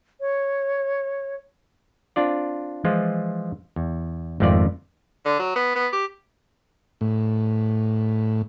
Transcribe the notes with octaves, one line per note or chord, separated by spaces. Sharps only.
C#5
C4 D4 F4 D5
E3 F3 G#3 F4
E2
G#1 F2 A3 D#4 F4 D5
D3
F#3
B3
B3
G4
A2